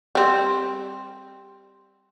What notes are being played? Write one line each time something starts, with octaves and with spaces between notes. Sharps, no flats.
G3 C4